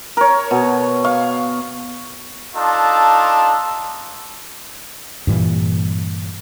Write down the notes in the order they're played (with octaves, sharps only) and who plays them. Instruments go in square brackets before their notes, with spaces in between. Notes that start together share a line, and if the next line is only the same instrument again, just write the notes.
[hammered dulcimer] A#4 C#5
B2
F5 C#6
[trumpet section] D4 D#4 F4 A4 A5
[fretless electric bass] G2 A#2 E3